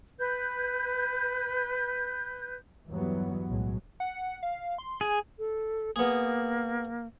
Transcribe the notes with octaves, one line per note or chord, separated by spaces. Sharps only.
B4 G6
E2 G2 E3 F#3 G3 B3
B1 A2 F#3 G#3
F#5
F5
C6
G#4 G#5
A4
A#3 B3 G#4